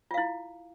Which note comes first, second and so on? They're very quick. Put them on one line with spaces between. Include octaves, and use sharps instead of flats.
F4 F5 E4